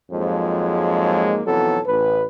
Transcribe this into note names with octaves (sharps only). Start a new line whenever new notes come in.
F2 G#2 F3 F#3 G#3 A#3
B1 F2 E3 F#3 B3 A4
A1 B4